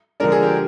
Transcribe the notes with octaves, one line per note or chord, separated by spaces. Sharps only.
D3 F3 G#3 D4 A#4
G#4
G4